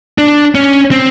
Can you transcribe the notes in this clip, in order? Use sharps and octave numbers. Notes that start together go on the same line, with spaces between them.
D4
C#4
C4